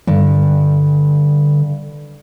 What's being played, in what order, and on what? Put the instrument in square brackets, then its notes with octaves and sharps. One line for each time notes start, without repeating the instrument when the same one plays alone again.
[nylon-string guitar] G2 [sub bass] D3